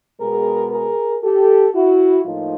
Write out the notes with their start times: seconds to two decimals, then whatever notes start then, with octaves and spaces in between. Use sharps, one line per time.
0.20 B2 G#3 B3 G#4 A#4
0.71 G#4 A#4
1.22 G4 A4
1.74 E4 F#4
2.24 A2 F3 A#3 D#4 F4